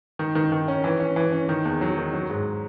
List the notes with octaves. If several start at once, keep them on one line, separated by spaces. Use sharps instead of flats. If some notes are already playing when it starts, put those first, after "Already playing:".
D#3
D#3
D#3
C#4
E3
C#4
E3
C#4
D#3
E2
F#3
D#3
F#3
G#2